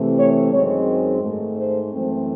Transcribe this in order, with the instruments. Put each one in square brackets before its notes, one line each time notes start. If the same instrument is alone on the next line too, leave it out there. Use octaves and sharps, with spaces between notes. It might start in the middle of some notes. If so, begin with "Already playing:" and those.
Already playing: [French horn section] C3 E3 A3 C4
C#5
F#2 D#3 G#3 C4 C#5
G#2 D#3 A3
C5
F#2 E3 A3 C4